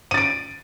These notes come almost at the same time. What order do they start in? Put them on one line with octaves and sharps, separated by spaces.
D#7 A6 D7